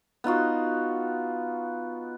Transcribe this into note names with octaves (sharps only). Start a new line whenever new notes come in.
B3 D#4 F4 F#4